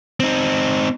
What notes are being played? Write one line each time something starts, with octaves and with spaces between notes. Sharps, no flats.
C4 D#4